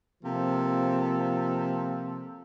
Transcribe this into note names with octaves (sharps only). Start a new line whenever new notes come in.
C3 F3 A#3 F4 A4